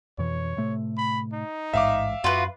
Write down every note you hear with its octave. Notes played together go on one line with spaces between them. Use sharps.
F2 B2 E3 C#5
A2 C3 A3
B5
D#4
A1 G#2 E5 F5 D6
F#2 F4 F#4 B4